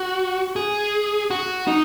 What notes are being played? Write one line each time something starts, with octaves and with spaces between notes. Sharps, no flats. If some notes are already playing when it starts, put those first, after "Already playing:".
Already playing: F#4
G#4
F#4
D#4